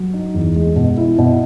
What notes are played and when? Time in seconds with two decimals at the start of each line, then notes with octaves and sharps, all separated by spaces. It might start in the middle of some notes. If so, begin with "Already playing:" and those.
Already playing: F#3
0.14 D#4
0.34 E2
0.56 G#3
0.76 B2
0.97 E4
1.18 B2